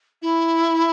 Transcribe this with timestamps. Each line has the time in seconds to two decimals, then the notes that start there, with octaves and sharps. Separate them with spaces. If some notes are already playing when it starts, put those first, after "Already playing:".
0.22 E4